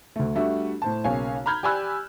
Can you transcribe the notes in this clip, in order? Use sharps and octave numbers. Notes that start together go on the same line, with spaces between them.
D2 A3
G3 A3 D4 F#4 E5
A2 C5 A5
B1 C#3 A#3 C#5 F5 G#5
A#5 B5 F6 G6 G#6
G4 D5 G#5 B5 E6 F#6